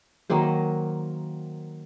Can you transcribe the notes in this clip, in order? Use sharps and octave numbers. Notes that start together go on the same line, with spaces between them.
D#3 F#3 A#3 C5